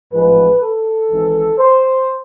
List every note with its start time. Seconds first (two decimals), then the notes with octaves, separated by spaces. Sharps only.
0.13 A1 G#2 F3 G#3 B4
0.62 A4
1.11 G#1 G#2 E3
1.59 C5